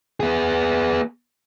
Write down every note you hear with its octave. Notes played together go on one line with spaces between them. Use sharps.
B3 G#4